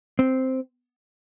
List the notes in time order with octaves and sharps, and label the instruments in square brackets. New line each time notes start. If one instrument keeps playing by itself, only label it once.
[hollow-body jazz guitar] C4